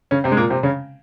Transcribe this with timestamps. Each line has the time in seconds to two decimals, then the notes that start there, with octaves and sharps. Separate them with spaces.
0.11 C#3 C#4
0.24 C3 C4
0.32 G#3
0.37 A#2 A#3
0.50 C3 C4
0.63 C#3 C#4